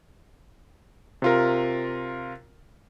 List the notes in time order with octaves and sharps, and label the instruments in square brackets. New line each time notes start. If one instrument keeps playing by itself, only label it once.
[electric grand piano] C3 F4 A#4